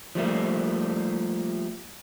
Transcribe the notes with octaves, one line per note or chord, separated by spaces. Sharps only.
F3 G3 A3 A#3